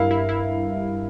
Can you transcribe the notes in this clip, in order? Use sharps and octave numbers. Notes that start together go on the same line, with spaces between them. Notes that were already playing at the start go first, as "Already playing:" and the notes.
Already playing: G2 E4 A#4 F5
E4
E4